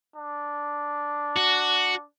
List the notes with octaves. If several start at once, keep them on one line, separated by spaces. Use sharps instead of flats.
D4
F#4